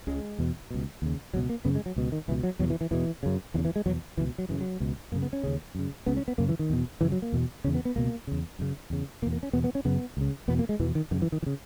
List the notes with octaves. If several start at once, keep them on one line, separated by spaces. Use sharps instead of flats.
C#2 C#3 G#3
E2 B2
C#2 B2
D#2 C#3
C#2 B2 F#3
A#3
F#2 C#3 B3
G#3
F#3
C#2 B2
D#3
C#2 B2 E3
F#3
E2 B2 F#3
E3
E3
E2 B2 E3
F#2 C#3
E2 C#3 E3
E3
G#3
E2 B2 F#3
C#2 B2 E3
F#3
F#2 C#3 E3
F#3
C#2 B2
F#2 C#3 A#3
B3
C#4
D#2 C#3
F#2 C#3
C#2 C#3 B3
C#4
B3
F#2 C#3 A#3
E3
D#3
E2 B2
F#2 C#3 E3
F#3
A#3
E2 B2
E2 C#3 C#4
B3
B3
C#2 B2 A#3
E2 C#3
F#2 C#3
E2 C#3
E2 B2 A#3
A#3
C#4
E2 B2 B3
B3
C#4
F#2 C#3 B3
C#2 C#3
E2 B2 B3
A#3
G#3
E2 B2 E3
D#3
F#2 C#3 D#3
E3
D#3
E3
C#3